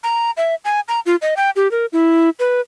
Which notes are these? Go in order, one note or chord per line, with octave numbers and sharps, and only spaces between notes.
A#5
E5
G#5
A#5
F4
D#5
G5
G4
A#4
E4
B4